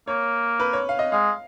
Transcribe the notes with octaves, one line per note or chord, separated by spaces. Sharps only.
A#3 C#5
B4
C#5
F5
D#5
G#3 F5